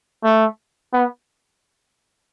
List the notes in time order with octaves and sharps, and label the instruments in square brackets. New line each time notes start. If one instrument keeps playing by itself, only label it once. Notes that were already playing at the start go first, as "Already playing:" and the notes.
[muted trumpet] A3
B3